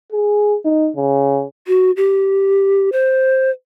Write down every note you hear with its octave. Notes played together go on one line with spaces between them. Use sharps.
G#4
D#4
C#3
F#4
G4
C5